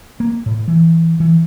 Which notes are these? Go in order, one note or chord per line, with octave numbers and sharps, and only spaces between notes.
A#3
A2
E3
E3